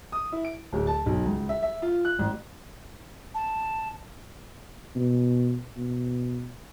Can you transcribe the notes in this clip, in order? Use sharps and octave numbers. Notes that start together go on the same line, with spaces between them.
D#6
E4
D7
D1
A5
B1
C#2
E5
E5
F4
F#6
A1
A5
B2
B2